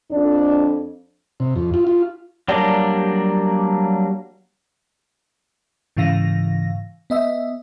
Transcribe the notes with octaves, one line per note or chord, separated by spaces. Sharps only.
F2 D4
C3
F2
F4
F4
F#3 G3 A#3 D4
G#2 C#3 E3 F5 A#6
B3 D#5 E5